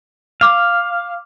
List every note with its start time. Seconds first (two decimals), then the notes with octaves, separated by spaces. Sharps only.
0.41 F5 D6 F6